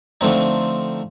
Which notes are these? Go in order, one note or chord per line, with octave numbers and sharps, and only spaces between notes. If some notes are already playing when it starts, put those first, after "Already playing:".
D3 F3 A3 C4 D#4